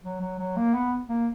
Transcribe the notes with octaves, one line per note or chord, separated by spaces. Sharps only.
F#3
F#3
F#3
A#3
B3
A#3